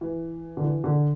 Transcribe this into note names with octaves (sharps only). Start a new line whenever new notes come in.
E3
D3
E3
D3